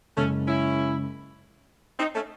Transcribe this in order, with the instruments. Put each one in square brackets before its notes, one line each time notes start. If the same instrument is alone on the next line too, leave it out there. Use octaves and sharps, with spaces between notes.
[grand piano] F#1 F#2 C#3 G#3 [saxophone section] A3 C#4
[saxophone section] C#4 E4
C4 D#4
A3 C#4